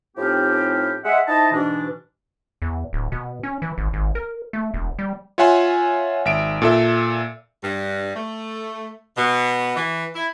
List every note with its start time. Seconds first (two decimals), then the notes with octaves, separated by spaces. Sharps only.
0.17 A2 F3 C4 C#4 D#4 G4
1.04 G#3 E5 F#5
1.27 D#4 E4 C5 D#5 A5
1.52 G#2 B2 E3 D4
2.62 E2
2.93 D1
3.12 B2
3.43 C#4
3.62 E3
3.78 G#1
3.93 G#1
4.15 A#4
4.53 A3
4.74 E1
4.99 G3
5.38 F4 C#5 E5 F#5 G#5 C6
6.25 G#1 E5 D7
6.62 A#2 A4 E5
7.63 G2
8.15 A3
9.17 B2
9.77 E3
10.15 E4